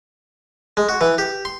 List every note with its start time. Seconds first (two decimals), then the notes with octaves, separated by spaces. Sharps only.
0.77 G#3
0.89 F#4
1.01 E3
1.18 G4
1.45 C6